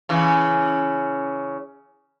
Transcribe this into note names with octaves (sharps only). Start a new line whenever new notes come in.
C#3 E3